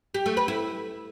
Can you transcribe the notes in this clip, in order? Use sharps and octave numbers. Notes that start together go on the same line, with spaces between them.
G4
A3
B4
E4